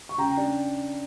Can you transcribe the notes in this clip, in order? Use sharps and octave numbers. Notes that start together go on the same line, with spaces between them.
C#6
C#3 G5 A#5
D4